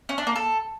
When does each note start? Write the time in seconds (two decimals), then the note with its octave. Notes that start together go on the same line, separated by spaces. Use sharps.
0.09 C#4
0.18 D4
0.27 A#3
0.36 A4